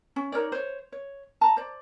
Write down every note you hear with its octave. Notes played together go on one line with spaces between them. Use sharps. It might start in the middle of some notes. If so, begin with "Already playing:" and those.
C#4
D#4 A#4 C#5 D5
C5 C#5
C#5
A5 A#5
C5 D5